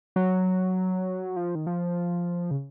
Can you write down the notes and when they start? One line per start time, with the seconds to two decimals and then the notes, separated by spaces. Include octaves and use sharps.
0.16 F#3
1.36 F3
1.55 D#3
1.67 F3
2.51 C#3